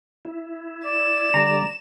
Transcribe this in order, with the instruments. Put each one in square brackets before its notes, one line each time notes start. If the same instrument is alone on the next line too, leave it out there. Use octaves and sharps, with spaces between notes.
[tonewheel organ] E4
[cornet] D5 [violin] E7
[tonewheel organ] D3 G3 [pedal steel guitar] A#5